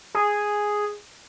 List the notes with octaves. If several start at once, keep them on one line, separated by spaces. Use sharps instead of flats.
G#4